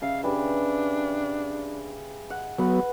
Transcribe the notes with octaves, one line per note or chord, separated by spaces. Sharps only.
C#3 E5 F5
D4 G4 G#4 B4
F#5
F#3 B3 B4 F#5